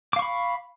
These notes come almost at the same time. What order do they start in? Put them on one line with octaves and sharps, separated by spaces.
D6 F5 C#6 B5